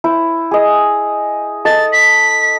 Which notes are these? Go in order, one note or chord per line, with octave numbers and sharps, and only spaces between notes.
E4 C5
G#4 D#5
A4 D#5 A6
B6